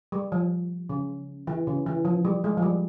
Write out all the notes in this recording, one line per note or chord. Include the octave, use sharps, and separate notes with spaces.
G3
F3
C#3
E3
C#3
E3
F3
G3
G#3
F3
G3